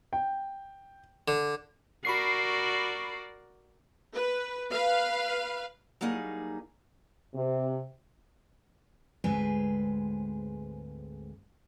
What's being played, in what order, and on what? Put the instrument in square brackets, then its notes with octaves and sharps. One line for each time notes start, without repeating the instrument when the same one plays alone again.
[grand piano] G5
[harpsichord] D3
[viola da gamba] F#4 A#4 D5 [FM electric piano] B5 C#6 C7
[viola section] B4
B4 F5
[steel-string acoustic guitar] F#3 G3 A#3 D#4 G#4
[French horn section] C3
[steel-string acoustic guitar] D2 G#2 G#3 C4 B4 G#5